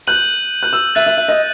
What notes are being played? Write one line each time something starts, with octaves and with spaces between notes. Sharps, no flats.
F#6 G6 D#7 F#7
F#6
E6
E5 F#6 A6 D#7 F#7
E5
E5
D#5